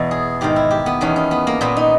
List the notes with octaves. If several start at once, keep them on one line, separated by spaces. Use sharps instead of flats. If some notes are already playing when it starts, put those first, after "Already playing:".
Already playing: E2 B2
G#4
G#2 D#3 G4
E4
G4
B3
E2 D#3 C#4
C#4
B3
A#3
A#2 B3
D#4